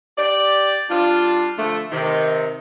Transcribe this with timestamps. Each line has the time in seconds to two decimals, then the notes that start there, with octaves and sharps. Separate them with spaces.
0.18 G4 D5
0.90 G3 D4 F4
1.58 D3 F3 A3
1.92 C3 D#3